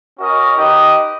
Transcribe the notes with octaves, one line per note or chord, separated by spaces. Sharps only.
C#4 F#4 A#4 D#5
D#4 G4 B4 D#5